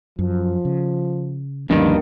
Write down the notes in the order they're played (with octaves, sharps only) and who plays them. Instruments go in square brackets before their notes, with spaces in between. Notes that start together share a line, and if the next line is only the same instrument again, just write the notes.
[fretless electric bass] F#2 [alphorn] F3
[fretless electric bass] C#3
[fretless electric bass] D2 F3 C#4 [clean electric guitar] G2 D#3 [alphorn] A#3